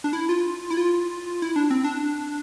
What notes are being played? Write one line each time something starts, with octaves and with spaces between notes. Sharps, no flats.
D4
E4
F4
E4
F4
E4
D4
C4
D4